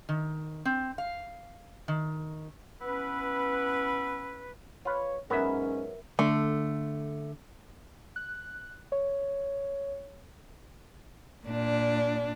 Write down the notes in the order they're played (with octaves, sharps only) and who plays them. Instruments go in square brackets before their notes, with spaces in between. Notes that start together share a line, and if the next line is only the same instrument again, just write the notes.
[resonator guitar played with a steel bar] D#3
C4
F5
D#3
[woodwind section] B3 C#4 E4 B4
[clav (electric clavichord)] F4 B4 [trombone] C#5
[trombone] G#2 [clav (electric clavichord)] F#3 B3 B4 [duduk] C#4 [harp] A#4 E5
[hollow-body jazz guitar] D3 [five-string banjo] A3
[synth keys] F#6
C#5
[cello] A#2 D4